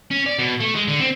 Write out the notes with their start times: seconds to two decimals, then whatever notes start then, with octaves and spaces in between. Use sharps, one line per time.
0.11 C#4
0.26 D5
0.39 B2
0.60 A3
0.75 G#3
0.87 D3
1.00 C4